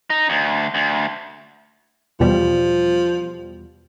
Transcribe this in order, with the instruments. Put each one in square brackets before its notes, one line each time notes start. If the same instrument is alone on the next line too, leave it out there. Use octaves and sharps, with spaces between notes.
[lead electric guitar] D#4
D2
D2
[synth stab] E2 B2 G3 [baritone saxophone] F3